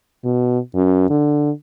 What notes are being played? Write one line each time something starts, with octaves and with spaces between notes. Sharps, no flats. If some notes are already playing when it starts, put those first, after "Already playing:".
B2
F#2
D3